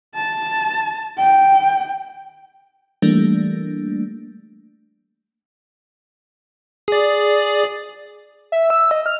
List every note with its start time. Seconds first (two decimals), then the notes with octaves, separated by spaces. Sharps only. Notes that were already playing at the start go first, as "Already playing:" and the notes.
0.15 A5
1.18 G5
3.02 E3 G3 A3 A#3 D4
6.88 G#4 D5
8.52 E5
8.70 E6
8.91 D#5
9.06 F6